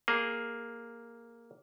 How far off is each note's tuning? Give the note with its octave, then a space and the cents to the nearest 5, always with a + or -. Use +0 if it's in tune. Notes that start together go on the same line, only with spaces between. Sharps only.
A#3 +0 G#4 +0